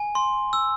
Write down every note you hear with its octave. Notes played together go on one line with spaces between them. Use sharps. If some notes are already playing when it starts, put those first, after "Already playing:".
Already playing: G#5
C6
E6